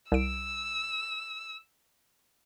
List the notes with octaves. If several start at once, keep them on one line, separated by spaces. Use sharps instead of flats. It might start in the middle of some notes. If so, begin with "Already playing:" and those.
C2 E6 D7